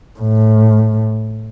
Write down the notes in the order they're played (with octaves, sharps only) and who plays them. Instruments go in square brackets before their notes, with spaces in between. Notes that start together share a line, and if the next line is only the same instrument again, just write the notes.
[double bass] A2